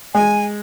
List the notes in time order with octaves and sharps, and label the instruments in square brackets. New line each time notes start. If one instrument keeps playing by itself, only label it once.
[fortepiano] G#3 [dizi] G#5